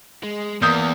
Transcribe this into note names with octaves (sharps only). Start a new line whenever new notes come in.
G#3
E2 A#3 D#6 G6